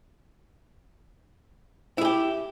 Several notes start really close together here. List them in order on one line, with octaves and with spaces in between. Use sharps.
E4 G#4 G4